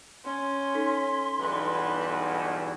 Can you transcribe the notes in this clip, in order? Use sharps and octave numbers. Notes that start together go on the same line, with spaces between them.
C#4 C6
D#4 A4 B6
B1 E2 G2 B4